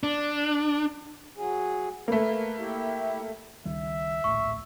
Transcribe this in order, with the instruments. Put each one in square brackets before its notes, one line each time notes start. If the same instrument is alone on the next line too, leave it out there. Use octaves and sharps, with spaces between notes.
[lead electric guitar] D4
[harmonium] F#3 G#4
[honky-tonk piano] A3 A#3 [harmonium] B4
[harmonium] E4 G4
[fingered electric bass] C#2 D#3 G3 [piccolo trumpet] E5
[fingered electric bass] D1 A#1 A2 [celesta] C#6